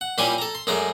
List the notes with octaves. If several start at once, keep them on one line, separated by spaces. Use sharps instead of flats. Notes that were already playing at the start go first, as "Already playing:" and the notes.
F#5
A#2 G3 C#4 E4 G4 G#5
A4 A#5
C6
F#2 G#3 A3 D5 A#5